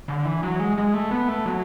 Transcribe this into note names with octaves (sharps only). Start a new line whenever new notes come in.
D3
E3
F#3
G#3
G#3
A3
B3
A3
F#3